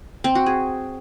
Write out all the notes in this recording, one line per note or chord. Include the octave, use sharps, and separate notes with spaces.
C4
F#4
G#4